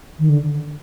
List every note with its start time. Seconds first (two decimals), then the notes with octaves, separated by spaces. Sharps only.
0.19 D#3
0.29 D3